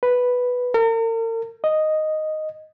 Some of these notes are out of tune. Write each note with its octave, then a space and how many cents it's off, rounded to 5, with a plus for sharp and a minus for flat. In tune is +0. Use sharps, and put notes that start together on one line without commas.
B4 +0
A#4 -40
D#5 +0